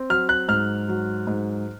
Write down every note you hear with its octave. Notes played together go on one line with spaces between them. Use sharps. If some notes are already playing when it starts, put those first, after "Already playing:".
Already playing: C4
F#3 F6
F#6
G#2 F6
F#3
G#2